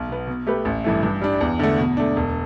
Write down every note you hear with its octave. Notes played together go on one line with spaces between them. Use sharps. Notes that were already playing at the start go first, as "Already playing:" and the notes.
Already playing: B1
B2 B3
B2
A3 G4 B4
A1
G2 E3 A3
G2
G3 D4
E2
D3 A3
B2
A3 D4
E1